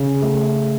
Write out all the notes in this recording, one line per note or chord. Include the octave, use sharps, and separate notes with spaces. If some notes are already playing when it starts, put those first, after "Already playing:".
Already playing: C#3
A3